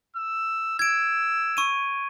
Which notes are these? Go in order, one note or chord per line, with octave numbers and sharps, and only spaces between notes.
E6
E6 G#6 D7
C#6 D#7